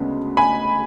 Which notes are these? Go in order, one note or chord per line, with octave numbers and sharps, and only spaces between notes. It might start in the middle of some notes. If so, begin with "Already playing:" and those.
Already playing: D2 C#3 G#3 B3
G#5 B5